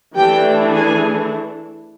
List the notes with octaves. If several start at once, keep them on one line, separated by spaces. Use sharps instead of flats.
E3 A3 D4 G4 G5
G#4 G#5